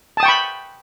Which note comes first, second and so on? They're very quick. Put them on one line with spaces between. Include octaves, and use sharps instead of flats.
A5 D#6 G5 C#6 B5